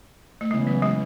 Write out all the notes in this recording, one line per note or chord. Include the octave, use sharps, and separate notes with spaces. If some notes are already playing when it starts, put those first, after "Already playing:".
A3
C#3 E3 G#3 B3
F#3
G#3